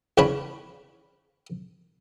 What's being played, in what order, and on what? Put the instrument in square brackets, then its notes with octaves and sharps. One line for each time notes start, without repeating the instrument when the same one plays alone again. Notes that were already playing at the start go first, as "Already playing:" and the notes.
[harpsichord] E2 C#3 C#4 D4 C#5 B5